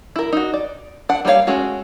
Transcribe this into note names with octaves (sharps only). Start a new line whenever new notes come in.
E4 A#4
D#4 F#4
D5
D4 F#5
G3 A#3 F4 C#5 F5
G#3 A3 C#4 F#4